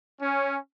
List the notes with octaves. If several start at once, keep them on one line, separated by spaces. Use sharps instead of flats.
C#4